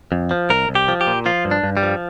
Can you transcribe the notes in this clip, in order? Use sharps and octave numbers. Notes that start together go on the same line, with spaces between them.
F2
F3
C2 A#4
C2
G4
F3
G4
A#2
F3 F4
G2
D4
G2
G3
F3